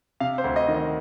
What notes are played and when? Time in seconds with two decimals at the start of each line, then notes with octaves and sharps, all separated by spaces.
0.20 C3 F5
0.38 C5
0.44 D2
0.56 D#5
0.68 D#3
0.74 D#5